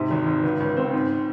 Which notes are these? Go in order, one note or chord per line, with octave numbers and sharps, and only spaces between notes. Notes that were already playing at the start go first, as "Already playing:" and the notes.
Already playing: G#2 C3
G#1
G#2
C#2
C#2
C4
G#2